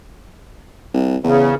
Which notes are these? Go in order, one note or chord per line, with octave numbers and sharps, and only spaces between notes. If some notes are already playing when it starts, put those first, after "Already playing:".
C2
E2 C#3